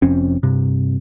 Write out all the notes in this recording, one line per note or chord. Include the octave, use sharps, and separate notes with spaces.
F1 F2 C4 C#4
G2 C3